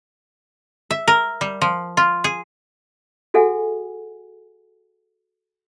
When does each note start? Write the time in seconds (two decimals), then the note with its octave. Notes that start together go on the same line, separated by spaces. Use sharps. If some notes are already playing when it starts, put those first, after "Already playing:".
0.91 E5
1.08 A#4
1.41 G3
1.62 F3
1.97 F4
2.24 G#4
3.34 F#4 G#4 A4 E5 F#5 G#5